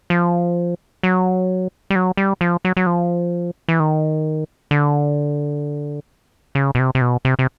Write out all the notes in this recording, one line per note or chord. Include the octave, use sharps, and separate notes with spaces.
F3
F#3
G3
F#3
G3
F3
F#3
F#3
F3
E3
D#3
D3
C#3
B2
C3
C3
B2
C3
C3